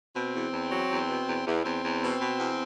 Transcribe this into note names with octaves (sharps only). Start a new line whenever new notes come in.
B2 C4
E2
E2
F#3
E2
B2
E2
E2
E2 C4
E2
B2
B2
E2